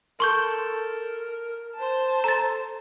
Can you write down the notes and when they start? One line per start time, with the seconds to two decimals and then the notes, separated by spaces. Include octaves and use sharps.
0.20 A4 A#4 C6 C#6 G6
1.75 C5 A5
2.24 A4 A#5 A6